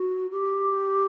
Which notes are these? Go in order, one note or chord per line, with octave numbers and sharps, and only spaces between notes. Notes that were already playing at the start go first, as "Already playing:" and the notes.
Already playing: F#4
G4